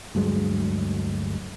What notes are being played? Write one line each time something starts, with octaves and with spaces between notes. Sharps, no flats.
D2 G2 F#3 G#3